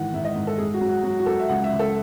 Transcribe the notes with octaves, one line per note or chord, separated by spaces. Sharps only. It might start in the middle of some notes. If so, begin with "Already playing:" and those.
Already playing: G#2 D#3 E3 F#5
G#2 E5
D#5
G#2
A4
G#2 G#4
F#4
F#3
F#4
F#3 F#4
F#4
F#3 A4
E5
C#2 F#5
E5
C#2
A4